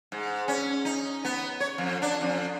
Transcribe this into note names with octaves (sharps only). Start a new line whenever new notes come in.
G#2
C#4
D#4
B3
C#5
F2
D4
F2